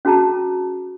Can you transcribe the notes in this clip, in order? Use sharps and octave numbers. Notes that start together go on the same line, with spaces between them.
C#4 F#4 G#4 A5 A#5